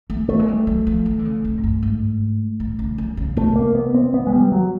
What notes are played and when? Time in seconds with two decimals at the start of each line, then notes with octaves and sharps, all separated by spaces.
0.10 A3
0.28 G3 A3
0.39 G#3
0.48 G3
0.67 F#3
0.87 F3
1.06 E3
1.19 D3
1.25 C#3
1.44 C3
1.57 G#2
1.64 G2
1.83 G#2
2.60 A2
2.79 C#3
2.98 D3
3.17 C#3
3.37 C3 A3
3.56 A#3
3.75 B3
3.94 C4
4.14 B3
4.27 G#3
4.33 G3
4.52 F#3